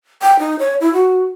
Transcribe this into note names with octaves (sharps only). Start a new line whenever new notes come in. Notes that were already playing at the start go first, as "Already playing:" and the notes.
G5
D#4
C#5
E4
F#4